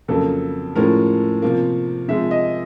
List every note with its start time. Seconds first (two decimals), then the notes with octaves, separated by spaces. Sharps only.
0.08 F2 C#3 F#3 A#3 A4
0.75 A2 F3 G#3 C#4 A#4
1.42 C3 F3 A#3
2.08 C3 F3 G#3 E5
2.31 D#5